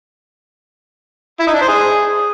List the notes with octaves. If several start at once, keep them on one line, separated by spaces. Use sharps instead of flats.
E4
D#4
D4
C5
G#4